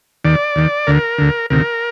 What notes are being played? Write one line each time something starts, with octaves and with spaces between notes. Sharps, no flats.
D#2 D#3 D5
D#2 D#3
D2 D3 A#4
D2 D3
D2 C3 D#3 A#4